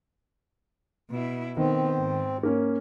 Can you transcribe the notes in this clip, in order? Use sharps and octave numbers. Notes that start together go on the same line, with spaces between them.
B2 E4
D#3 B3 C4
G#2
A#3 C#4